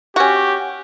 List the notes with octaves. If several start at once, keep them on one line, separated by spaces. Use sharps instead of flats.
C#4 F#4 G4